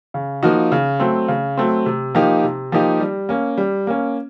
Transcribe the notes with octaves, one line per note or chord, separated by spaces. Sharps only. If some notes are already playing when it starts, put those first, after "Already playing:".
C#3
F3 A#3 D#4 F#4
C#3
F#3 A3 C4
C#3
F#3 A3 C4
C3
F3 A#3 D#4 G4
C3
F3 A#3 D#4 G4
G3
A#3 C#4
G3
A#3 C#4